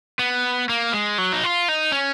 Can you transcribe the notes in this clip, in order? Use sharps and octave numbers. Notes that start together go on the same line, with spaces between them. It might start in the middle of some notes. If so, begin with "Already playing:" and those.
B3
A#3
G#3
F#3
D#4
F4
D#4
C#4